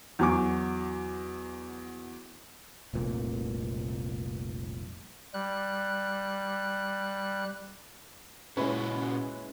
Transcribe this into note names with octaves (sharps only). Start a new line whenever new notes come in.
E2 F#3 F#4 G#5 C#6 D6
F1 C2 A#2
G3 F#6
A#2 G#3 C#4 E4 F#4 B4